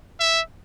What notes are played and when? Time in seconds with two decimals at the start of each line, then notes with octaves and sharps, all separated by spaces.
0.20 E5